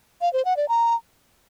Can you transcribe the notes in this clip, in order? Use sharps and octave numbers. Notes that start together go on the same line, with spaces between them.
F5
C5
F#5
D5
A#5